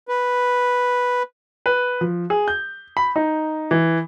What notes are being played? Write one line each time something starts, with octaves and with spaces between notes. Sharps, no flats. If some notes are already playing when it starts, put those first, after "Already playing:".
B4
B4
F3
G#4
G6
B5
D#4
E3